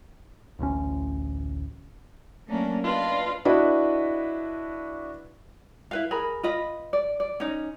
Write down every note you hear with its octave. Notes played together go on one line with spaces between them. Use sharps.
D1 A1 D2 C#4
F#3 A3 A#3 C#4 D4 A#4
D4 F4 B4 D#5
D4 E4 F#4 B4 D#5
E4 B4 F5
G#4 A#4 B5
F4 B4 D#5 B5
D5
D5
C#4 D#4